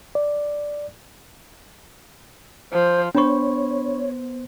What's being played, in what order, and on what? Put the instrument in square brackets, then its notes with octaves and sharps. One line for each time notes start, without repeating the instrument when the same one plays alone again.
[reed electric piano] D5
[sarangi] F3 [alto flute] C5
[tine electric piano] B3 C5 [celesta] D4 B5 C#6 [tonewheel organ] C#5